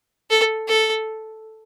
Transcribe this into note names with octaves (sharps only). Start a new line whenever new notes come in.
A4
A4